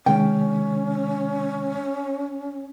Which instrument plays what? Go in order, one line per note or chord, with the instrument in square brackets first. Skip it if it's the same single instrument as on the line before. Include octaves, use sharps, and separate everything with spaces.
[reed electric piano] C3 D#3 G#3 [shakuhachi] C#4 [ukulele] G5